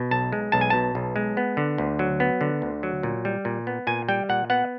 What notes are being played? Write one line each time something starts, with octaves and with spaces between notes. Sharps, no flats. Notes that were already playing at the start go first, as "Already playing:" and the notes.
Already playing: B2
B1 A5
G#3
B1 A5
G#5
B2 A5
B1
G#3
B3
D3
D2
F#3
B3
D3
D2
F#3
A#2
G3
A#2
B3
A#2 G#5
G3 G5
A#2 F#5
B3 F#5